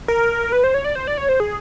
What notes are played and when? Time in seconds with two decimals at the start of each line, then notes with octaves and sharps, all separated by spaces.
0.08 A#4
0.52 B4
0.64 C5
0.74 C#5
0.84 D5
0.95 C5
1.07 D5
1.18 C#5
1.29 C5
1.40 G#4